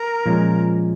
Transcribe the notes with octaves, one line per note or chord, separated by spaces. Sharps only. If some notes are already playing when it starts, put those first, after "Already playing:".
Already playing: A#4
A#2 F3 G#3 C#4